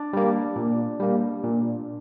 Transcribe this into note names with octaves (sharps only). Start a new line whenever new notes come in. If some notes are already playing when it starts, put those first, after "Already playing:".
Already playing: D4 D5
G3 A#3
A#2
G3 A#3
A#2